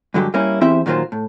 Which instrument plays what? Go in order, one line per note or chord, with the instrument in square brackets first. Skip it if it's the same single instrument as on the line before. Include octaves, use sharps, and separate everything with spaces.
[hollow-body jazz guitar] G2 D3 F#3 G#3 G4
G3 A#3 C#4 E4
E2 C4 E4 G4 C5 E5
A#2 D#3 F#3 A#3 F4 C5
A2